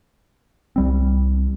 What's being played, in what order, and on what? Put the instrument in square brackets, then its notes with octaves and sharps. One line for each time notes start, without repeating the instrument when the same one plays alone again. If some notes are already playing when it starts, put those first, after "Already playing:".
[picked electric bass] C2 G3 C4